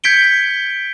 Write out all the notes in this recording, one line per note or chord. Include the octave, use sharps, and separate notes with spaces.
G6 G#6 B6 C#7 D7 G7